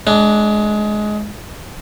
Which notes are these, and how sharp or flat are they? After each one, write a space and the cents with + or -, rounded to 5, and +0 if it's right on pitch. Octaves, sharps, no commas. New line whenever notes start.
G#3 +20 D4 +0